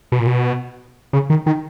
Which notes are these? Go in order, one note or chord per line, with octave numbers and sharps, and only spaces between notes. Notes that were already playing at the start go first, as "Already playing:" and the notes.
B2
A#2
B2
C#3
D#3
D#3